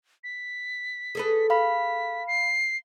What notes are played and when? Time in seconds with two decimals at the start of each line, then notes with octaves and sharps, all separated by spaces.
0.24 B6
1.15 G#4 A4 B4
1.50 F5 B5 B6
2.27 C7